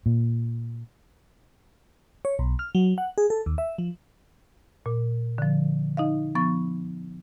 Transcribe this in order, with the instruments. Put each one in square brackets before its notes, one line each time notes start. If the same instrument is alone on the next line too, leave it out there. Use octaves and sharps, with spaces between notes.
[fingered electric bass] A#2
[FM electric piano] C#5
B1
F6
F#3
F#5
G#4
A4
D#2
E5
F3
[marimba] A#2
D3 F3
D#4 D#5 F5
F3 B3 C#6 A6